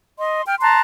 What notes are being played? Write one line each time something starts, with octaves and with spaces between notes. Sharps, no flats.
D#5 C6
G5 F6
A5 A#5 C6 F#6